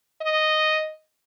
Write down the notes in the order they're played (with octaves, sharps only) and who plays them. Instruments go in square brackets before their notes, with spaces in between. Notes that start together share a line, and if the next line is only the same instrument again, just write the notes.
[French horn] D#5